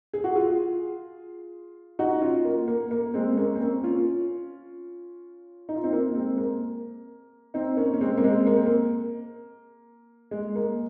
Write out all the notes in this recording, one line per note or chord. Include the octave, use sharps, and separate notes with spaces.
G#4
F#4
F4 G#4
D#4 F#4
C#4 F4
A#3
A#3
A#3
G#3 C4
C4
A#3 C#4
C4
A#3 C#4
C#4 F4
D#4
F4
C4 D#4
A#3
G#3 C4
A#3
C4 D#4
A#3 C#4
C#4
G#3 C4
A#3
G#3 C4
A#3
C4
A#3
G#3
A#3